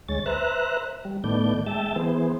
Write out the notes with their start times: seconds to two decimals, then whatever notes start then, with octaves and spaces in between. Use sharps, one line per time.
0.09 D2 G#3 C#5 A6
0.26 B4 C5 E5 A#5 F#6
1.05 G3
1.24 A2 D#3 A3 B3 D5 G6
1.66 G#3 E5 G5 A5
1.96 E3 B3 G#4 C5